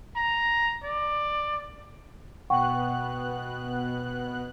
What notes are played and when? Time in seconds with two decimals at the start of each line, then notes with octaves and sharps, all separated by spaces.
0.16 A#5
0.84 D5
2.50 B2 B3 F#5 G5 C#6 F#6